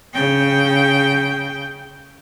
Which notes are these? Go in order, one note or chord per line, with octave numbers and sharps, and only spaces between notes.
C#3 G5